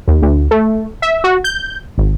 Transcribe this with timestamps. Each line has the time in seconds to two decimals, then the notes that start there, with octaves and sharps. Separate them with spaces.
0.08 D#2
0.22 D2
0.51 A3
1.02 E5
1.24 F#4
1.44 G6
1.98 G#1